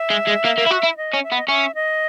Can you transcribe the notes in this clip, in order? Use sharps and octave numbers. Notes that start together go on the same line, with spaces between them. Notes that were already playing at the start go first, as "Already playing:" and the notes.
Already playing: E5
G#3
G#3
A#3
A#3
E4
F#4
E4
D#5
C#4
E5
B3
D#5
C#4 E5
D#5